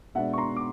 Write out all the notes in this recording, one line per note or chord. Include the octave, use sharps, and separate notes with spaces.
B2 G#3 B3 D4 E5 F#5
C#6
A#5 C6
D6